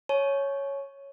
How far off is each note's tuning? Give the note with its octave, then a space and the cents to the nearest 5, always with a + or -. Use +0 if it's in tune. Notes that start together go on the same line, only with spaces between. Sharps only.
C#5 +0 G#5 +45